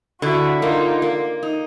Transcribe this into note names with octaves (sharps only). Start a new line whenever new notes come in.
D3 E4 F#4
A#3 D#4 F4
A#3
D#4